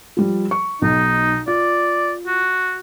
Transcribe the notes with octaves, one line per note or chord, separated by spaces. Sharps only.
F3 G3
C#6
B1 D#4
F4 D5
F#4